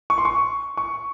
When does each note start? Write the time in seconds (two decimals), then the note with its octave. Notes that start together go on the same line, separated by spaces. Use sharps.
0.10 C#6
0.18 C6
0.25 C#6
0.77 C#6